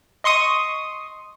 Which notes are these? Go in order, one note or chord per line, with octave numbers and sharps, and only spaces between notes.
D#5 C6 C#6 D#6